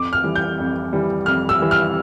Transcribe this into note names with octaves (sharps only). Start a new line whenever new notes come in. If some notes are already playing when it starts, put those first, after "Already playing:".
Already playing: F2 D6
F6
E3 G3
G6
F2
E3 G3
F2 F6
E6
E3 G3
F6